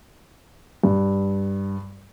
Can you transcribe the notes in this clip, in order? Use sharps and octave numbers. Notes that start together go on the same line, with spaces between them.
G2